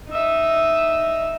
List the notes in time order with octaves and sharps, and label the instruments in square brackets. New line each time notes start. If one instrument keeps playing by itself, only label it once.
[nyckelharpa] D#4 E5